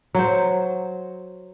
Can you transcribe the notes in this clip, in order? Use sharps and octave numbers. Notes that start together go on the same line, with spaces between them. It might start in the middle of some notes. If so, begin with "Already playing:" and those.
F#3 C5